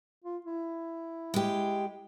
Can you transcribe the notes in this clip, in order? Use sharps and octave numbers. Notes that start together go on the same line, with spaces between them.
F4
E4
G#3 G4